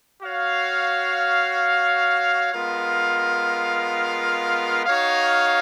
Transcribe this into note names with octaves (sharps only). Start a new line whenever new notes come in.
F#4 C#5 F5
G#3 B3 F4 A#4 F5
D#4 F#4 C#5 F5